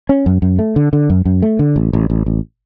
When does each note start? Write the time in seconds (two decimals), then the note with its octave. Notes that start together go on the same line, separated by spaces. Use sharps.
0.09 C#4
0.26 F#2
0.42 F#2
0.59 A3
0.76 D3
0.93 D3
1.10 F#2
1.25 F#2
1.42 A3
1.59 D3
1.76 A1
1.93 A1
2.10 A1
2.26 A1